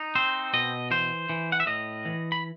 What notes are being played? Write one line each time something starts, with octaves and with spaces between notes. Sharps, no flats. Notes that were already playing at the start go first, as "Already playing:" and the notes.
Already playing: D#4
C4 C5
B2 D#5
E3 C5
E3
F#5
E5
A2 D#5
E3
B5